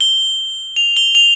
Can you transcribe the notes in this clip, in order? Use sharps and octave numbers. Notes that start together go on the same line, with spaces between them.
G7
F7
G7
F7